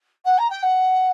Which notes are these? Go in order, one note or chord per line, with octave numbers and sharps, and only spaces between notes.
F#5
A#5
G5
F#5